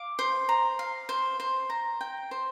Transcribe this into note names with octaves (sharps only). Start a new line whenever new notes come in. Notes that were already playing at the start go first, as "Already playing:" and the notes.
Already playing: F5 D6
C5
A#5
F5
C5
C5
A#5
G5
C5